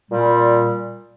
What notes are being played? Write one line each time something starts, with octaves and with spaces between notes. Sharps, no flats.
A#2 G3